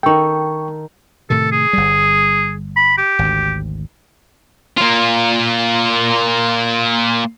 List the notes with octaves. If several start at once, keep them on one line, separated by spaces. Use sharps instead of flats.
D#3 A4 G5 C#6
A2 C3 D#3 A4
G#4
G1 G3
B5
G4
G#1 D2
A#3 F4